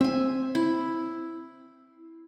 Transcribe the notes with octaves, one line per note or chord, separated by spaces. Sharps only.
C4 E5 G#5
E4